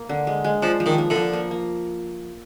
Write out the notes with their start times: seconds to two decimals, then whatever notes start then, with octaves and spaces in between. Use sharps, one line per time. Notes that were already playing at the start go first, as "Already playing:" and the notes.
Already playing: A#3
0.09 D3
0.27 G#3
0.44 G#3
0.62 F3 D4
0.80 F3
0.86 D#3
0.98 A#3
1.10 D3
1.15 F3
1.33 A#3
1.51 A#3